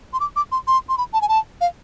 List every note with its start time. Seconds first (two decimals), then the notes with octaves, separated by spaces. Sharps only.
0.13 C6
0.20 D6
0.36 D6
0.52 C6
0.68 C6
0.89 C6
0.98 B5
1.13 A5
1.21 G#5
1.29 A5
1.61 F5